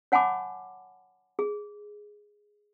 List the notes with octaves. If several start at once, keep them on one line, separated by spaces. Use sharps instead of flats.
C#5 F#5 G#5 A5 B5 D6
G#4